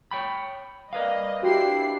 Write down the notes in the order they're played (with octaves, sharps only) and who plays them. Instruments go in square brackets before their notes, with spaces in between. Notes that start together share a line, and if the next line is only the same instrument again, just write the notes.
[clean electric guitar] C#5 G5 B5
[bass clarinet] G3 [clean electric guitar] A#4 B4 F5 [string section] D#5
[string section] D4 E4 C7 [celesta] F#4 [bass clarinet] G4